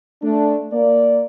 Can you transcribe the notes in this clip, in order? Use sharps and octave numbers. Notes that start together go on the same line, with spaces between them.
A3 D4
A#3 D5